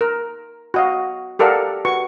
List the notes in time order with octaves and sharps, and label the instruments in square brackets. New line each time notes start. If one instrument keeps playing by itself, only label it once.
[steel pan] A#4
F#4 D#5 F5
G4 A4 A#4 D5 F5 F#5
F#4 B4 C#6